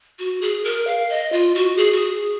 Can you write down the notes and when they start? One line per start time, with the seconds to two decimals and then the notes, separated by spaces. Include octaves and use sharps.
0.19 F#4
0.42 G#4
0.65 A#4
0.87 F5
1.09 D#5
1.32 F4
1.55 F#4
1.77 G#4
1.93 F#4
2.00 G#4